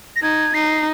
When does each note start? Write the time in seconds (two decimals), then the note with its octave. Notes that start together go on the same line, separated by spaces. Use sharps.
0.16 A#6
0.22 D#4 G#6
0.54 D#4 C7